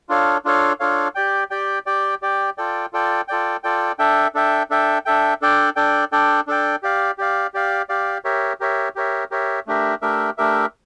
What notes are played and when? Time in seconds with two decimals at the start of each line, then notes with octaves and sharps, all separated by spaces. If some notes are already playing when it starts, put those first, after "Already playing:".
0.09 D4 F4 A4 C#5 F5
0.45 D4 F4 A4 C#5 F5
0.80 D4 F4 A4 C#5 F5
1.15 G4 D5 G5
1.50 G4 D5 G5
1.86 G4 D5 G5
2.22 G4 D5 G5
2.58 F4 A4 D5 G5
2.93 F4 A4 D5 G5
3.28 F4 A4 D5 G5
3.63 F4 A4 D5 G5
3.99 D4 A4 E5 G5
4.35 D4 A4 E5 G5
4.70 D4 A4 E5 G5
5.06 D4 A4 E5 G5
5.42 D4 A4 D5 G5
5.76 D4 A4 D5 G5
6.12 D4 A4 D5 G5
6.47 D4 A4 D5 G5
6.83 G4 D5 F5
7.18 G4 D5 F5
7.54 G4 D5 F5
7.89 G4 D5 F5
8.24 G4 A#4 C#5 E5
8.60 G4 A#4 C#5 E5
8.96 G4 A#4 C#5 E5
9.31 G4 A#4 C#5 E5
9.67 A3 D4 G4 A#4 E5
10.02 A3 D4 G4 A#4 E5
10.38 A3 D4 G4 A#4 E5